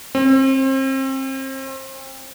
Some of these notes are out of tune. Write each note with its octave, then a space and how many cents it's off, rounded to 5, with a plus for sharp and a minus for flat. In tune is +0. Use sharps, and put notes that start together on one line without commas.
C4 +35